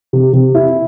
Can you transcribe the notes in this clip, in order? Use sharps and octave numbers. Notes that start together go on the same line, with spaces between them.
C3
C3
E4